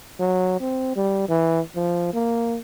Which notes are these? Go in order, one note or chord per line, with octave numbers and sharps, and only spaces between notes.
F#3
C4
G3
E3
F3
A#3